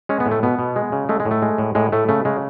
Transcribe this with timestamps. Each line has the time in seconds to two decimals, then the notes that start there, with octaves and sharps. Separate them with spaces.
0.09 G#3 C#4
0.20 B3
0.26 A2
0.31 A3
0.43 B2 B3
0.59 B2
0.76 G#3
0.92 C#3
1.09 G#3 A3
1.20 G#3
1.25 A2
1.31 A3
1.42 G#3
1.58 A2
1.75 A2 G#3
1.92 A2 A3
2.09 C#3 A3
2.25 C#3 G#3